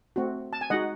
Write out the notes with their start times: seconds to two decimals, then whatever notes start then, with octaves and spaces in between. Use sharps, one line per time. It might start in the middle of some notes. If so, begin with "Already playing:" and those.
0.16 A3 C4 F#4
0.53 A5
0.61 G#5
0.70 G#3 D#4 F#4 D#5 F#5